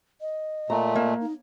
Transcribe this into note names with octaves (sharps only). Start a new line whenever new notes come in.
D#5
A#2 A3 A#5
A#3
D#4